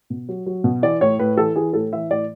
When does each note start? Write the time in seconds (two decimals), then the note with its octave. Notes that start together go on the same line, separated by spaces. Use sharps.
0.10 B2
0.29 F#3
0.46 F#3
0.64 B2
0.83 E3 D5
1.01 A2 C#5
1.19 A2 B4
1.37 E3 A4
1.56 E3 G#4
1.73 A2 A4
1.93 E3 E5
2.10 A2 D5